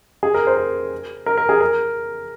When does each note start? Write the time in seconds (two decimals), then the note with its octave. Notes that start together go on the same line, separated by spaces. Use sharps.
0.23 G#4
0.34 A#4
0.47 C5
0.57 A#4
1.26 A#4
1.38 A#4
1.49 G#4
1.61 A#4